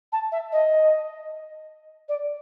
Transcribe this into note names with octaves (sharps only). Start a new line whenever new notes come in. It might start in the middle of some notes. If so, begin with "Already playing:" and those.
A5
E5
D#5
D5